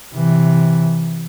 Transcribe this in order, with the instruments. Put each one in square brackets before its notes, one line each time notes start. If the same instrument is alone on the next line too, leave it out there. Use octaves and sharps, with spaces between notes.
[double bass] C3 E3